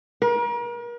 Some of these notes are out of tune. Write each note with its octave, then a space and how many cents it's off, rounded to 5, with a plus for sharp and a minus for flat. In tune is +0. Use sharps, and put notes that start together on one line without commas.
A#4 +40